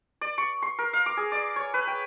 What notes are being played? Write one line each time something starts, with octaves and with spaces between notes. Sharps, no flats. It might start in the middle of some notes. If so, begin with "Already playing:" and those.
D5
C#6
C6
A#4
F5
D6
G#4
D5
C#5
B4
G5